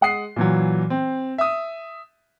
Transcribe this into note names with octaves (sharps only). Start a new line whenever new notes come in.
G#3 F#5 D#6 C7
A#2 E3 F#3
C4
E5 D#6